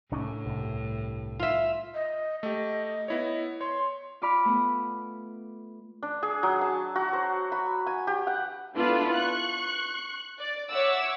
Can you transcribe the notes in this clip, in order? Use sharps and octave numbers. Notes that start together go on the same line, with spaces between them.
C2 A2 C#4 D4
C2 G2
F4 E5
D#5
A3 G4 D#5
B3 E4 C#5
C#5 C6
F4 D5 B5 F6
A3 B3
D4
G#4
F#3
A5
F#4
C5
B5
G#5
G4
F#5
B3 D4 E4 F4 A4 B4
C#6 F#6
D5
C#5 E5 F#5 D6 E6